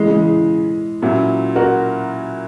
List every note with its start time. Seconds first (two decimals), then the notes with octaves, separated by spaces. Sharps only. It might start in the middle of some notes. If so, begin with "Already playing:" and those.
Already playing: C#3 E3 G#3
0.11 E3 G#3
1.02 A#2 F#3 C#4 E4
1.55 F#4 A#4